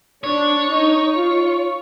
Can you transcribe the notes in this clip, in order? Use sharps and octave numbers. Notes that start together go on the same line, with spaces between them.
D4 C#5
D#4
F4